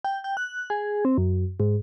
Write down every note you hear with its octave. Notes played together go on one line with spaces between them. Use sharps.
G5
G5
F#6
G#4
C4
F#2
G#2